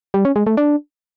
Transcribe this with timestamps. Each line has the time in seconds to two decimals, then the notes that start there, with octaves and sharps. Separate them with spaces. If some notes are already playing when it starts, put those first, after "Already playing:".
0.14 G3
0.25 C#4
0.36 G#3
0.47 A3
0.57 D4